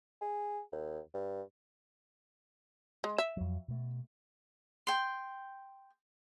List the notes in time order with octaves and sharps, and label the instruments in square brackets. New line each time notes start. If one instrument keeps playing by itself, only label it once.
[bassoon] G#4
D#2
G2
[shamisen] G#3
E5
[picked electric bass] F2 F#3
B2 A3
[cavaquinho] G5 C6